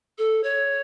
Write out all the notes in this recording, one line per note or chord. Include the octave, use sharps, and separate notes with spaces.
A4
C#5